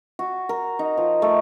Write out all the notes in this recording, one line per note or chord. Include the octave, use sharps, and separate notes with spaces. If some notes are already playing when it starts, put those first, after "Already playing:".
F#4
A#4
D#4
F3
A3